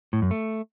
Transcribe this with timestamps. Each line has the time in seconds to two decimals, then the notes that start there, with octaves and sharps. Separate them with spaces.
0.13 A2
0.22 F#2
0.31 A3